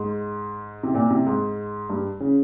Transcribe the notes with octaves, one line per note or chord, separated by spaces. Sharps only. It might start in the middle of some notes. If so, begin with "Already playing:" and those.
Already playing: G#2
C3
A#2
C3
G#2
G2
C#3